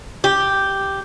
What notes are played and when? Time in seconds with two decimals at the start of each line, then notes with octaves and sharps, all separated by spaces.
0.24 G4